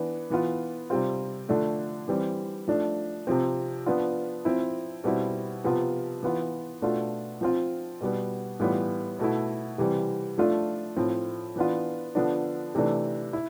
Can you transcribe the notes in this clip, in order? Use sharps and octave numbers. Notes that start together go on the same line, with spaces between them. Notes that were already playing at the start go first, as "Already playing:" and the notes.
Already playing: E3 B3 D4
E3 B3 F4
C3 G3 C4 F4
D3 F3 A3 D4
E3 G3 C4
F3 A3 D4
C3 F3 C4
F3 B3 D4 F4
F3 C4 E4
B2 G3 C4 E4
C3 F3 B3 F4
E3 B3 F4
B2 A3 D4 F4
F3 C4 F4
B2 G3 B3
A2 E3 G3 B3 F4
B2 A3 E4
C3 E3 G3 C4
F3 A3 D4 F4
A2 F3 C4
E3 B3 D4 F4
D3 F3 B3 D4
C3 E3 A3 D4
E4